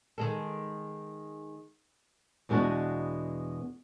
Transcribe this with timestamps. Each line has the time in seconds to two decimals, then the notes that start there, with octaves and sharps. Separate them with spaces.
0.18 D#3 G#3 A4
2.49 E2 B2 G#3 B3 D4 F#4